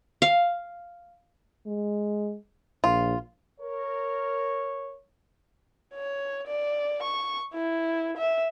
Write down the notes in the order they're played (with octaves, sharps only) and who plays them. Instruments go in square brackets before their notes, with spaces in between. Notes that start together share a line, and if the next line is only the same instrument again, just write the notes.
[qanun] F5
[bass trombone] G#3
[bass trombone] A#1 [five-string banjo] F4
[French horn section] A#4 [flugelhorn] C#5
[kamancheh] C#5
D5
C#6
E4
E5